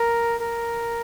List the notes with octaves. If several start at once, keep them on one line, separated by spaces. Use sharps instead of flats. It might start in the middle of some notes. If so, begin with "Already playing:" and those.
Already playing: A#4
A#4